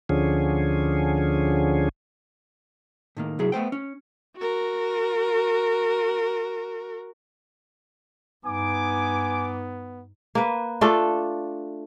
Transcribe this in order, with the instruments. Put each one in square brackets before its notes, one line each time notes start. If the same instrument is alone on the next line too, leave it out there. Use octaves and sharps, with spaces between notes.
[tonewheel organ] D2 D3 F3 C#4 G#4
[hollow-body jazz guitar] A2 D#3 A#3
C2 G2 F#3 E4 G#4
A3 B3 C5 G5
C#4
[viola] F#4 A#4
[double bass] G2 D#4 [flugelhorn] B3 [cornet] G#5 [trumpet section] D6
[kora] A#3 B4
A3 D4 F4 A4